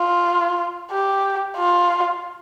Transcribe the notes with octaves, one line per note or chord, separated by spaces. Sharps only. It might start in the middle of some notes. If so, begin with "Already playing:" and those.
Already playing: F4
G4
F4